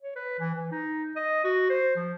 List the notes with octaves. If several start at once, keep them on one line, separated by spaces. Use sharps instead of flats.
C#5
B4
E3
E3
D#4
D#5
F#4
C5
F3